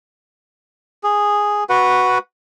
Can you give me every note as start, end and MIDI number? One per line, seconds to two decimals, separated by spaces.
1.03 1.64 68
1.69 2.18 66
1.69 2.18 71
1.69 2.18 78